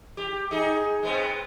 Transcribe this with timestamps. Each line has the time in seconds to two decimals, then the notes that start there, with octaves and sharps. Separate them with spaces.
0.17 G4
0.51 D#4 G#4
1.03 G#3 B3 C4